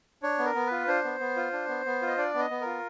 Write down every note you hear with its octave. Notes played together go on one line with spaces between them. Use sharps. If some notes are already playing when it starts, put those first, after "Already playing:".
D4 C#5
B3
A#4
B3
F4 B4
D4 C5
B3
B3
F4
D4
B3
B3
F4
D#5
D4 D5
B3
D#5
B3
F4 A#4